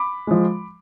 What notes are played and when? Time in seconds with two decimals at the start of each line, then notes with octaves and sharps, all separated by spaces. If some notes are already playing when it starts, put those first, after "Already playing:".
Already playing: B5 D6
0.27 F3 G#3